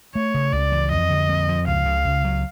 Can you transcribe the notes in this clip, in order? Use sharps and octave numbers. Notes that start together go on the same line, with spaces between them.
A3 C#5
C#3
C#2 D5
E3
F2 D#5
D3
F2
F3
C#2 F5
C#3
C#2
F#3